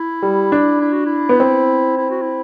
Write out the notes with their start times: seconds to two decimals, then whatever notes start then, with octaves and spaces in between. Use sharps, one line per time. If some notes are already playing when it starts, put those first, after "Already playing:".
Already playing: E4
0.22 G3
0.52 D4
0.81 E4
0.93 F#4
1.05 E4
1.29 B3
1.40 C4
1.98 E4
2.10 F#4
2.22 E4